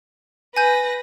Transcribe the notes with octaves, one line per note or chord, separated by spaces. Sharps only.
B4 G#5 G6 A#6